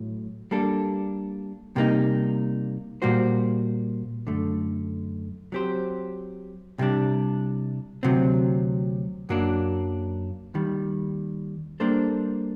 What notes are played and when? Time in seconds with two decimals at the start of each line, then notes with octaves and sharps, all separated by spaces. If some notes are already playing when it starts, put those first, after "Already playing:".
Already playing: A2 F#3
0.51 G3 A#3 D4 A4
1.76 C3 G3 A#3 D#4
3.02 A#2 G3 A#3 F#4 C5
4.27 F#2 D3 A3
5.52 F#3 C4 G4 C5
6.78 C2 C3 G3 D4
8.03 D2 C3 F#3 C4
9.29 F#2 F#3 A#3 D4
10.54 D#2 D#3 G3
11.80 G3 A#3 D4 A4 C5